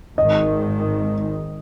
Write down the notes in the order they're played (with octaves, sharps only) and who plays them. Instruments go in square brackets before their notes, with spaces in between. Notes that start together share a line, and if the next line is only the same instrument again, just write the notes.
[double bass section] G#1 G#2 D#3 [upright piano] D#5